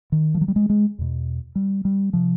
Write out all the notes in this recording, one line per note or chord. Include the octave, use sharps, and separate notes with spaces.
D#3
F3
F#3
G3
G#3
G#3
E2 B2
G3
G3
C3 F3